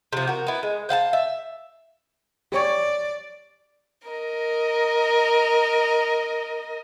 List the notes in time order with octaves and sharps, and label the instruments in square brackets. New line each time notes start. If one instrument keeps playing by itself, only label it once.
[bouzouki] C3 F3
F#4 A#4
B3 E4
G#3
C5 F5 F#5 A5
E5
[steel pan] G4 C#5 [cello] D5
[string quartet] A#4 D#5